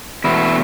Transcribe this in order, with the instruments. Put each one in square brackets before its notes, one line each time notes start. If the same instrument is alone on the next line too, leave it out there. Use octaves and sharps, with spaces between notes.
[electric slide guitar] E2 B2 A3 E4